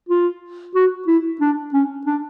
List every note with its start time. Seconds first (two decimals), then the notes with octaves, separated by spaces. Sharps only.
0.09 F4
0.75 F#4
1.07 E4
1.41 D4
1.74 C#4
2.06 D4